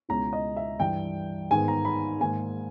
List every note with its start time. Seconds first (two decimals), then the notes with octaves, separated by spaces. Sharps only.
0.09 C#2 B2 G#3 C#4 E4 A#5
0.33 D#5
0.56 E5
0.79 G2 E3 G3 G5
1.51 G#2 D#3 G#3 B3 G#5
1.68 A#5
1.85 B5
2.20 G#2 D#3 A#3 G#5